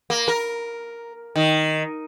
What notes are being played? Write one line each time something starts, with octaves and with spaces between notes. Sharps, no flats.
A#3
A#4
D#3